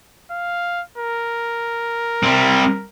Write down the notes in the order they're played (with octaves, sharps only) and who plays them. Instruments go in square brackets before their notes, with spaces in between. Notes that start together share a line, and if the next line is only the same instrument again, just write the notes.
[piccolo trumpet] F5
A#4
[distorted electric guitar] G3 C4